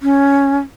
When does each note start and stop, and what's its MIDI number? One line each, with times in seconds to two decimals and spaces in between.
0.01 0.59 61